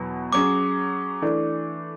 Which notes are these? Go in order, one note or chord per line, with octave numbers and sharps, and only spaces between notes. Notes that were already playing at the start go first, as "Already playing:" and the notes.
Already playing: E2 B2 F#3
F#3 C#4 G#4 D6
E3 A3 D4